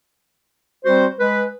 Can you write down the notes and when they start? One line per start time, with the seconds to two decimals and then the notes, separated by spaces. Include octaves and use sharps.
0.85 G3 C4 F#4 C5
1.19 G#3 B4